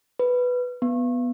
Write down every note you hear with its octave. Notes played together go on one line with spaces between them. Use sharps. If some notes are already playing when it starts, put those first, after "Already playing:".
B4
B3